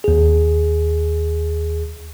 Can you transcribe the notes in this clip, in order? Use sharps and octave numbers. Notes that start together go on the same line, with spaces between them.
D#2 G#4